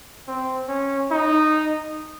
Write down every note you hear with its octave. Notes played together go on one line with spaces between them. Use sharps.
C4
C#4
D#4